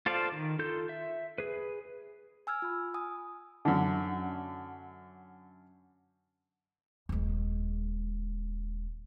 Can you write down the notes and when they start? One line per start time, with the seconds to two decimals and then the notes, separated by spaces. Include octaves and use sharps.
0.06 F4 A4 C5 D5 F5
0.32 D#3
0.59 F4 A4 G6
0.89 E5
1.38 G#4 B4
2.47 G#5 E6 F6 G#6
2.62 F4 B5
2.94 G#5 D#6
3.65 F#2 D3
7.09 D#1 G#3